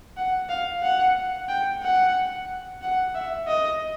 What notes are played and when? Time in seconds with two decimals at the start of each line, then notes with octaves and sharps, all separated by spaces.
0.17 F#5
0.49 F5
0.83 F#5
1.49 G5
1.82 F#5
2.82 F#5
3.15 E5
3.48 D#5